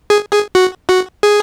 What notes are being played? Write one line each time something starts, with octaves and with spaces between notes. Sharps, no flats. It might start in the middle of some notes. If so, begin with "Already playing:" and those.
G#4
G#4
F#4
F#4
G#4